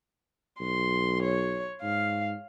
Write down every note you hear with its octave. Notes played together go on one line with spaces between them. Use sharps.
B1 C6
C#5
G#2 F5